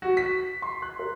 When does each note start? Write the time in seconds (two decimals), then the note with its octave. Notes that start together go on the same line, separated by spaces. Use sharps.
0.02 F#4
0.17 B6
0.62 C6
0.82 F#6
0.99 A#4